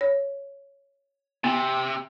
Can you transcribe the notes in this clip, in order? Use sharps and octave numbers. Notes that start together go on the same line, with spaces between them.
C#5
C3 B3